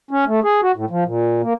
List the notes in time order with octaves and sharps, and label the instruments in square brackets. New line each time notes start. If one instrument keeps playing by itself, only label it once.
[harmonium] C#4
A3
G#4
F#4
A2
F3
A#2
A#3